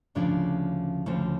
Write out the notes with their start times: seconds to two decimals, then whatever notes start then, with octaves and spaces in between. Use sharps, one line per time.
0.15 D2 C#3 F3 D4
1.06 D2 C#3 F3